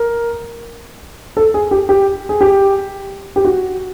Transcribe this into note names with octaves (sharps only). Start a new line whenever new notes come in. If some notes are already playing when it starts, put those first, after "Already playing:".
Already playing: A#4
A4
G#4
G4
G4
G#4
G4
G4
F#4